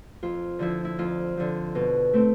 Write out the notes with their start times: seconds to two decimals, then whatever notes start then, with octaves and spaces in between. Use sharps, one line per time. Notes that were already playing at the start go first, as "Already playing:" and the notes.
0.23 F2 F4
0.59 D3 F3 E4
0.85 E4
0.99 F2 F4
1.37 D3 F3
1.75 B2
2.13 A3 C4